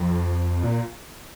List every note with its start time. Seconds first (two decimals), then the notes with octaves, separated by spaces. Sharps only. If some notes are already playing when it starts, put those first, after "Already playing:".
Already playing: F2
0.63 A#2